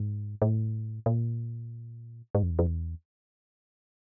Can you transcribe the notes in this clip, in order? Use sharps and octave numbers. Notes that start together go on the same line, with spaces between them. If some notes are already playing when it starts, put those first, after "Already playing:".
Already playing: G#2
A2
A#2
G#2
F2
E2
F2
E2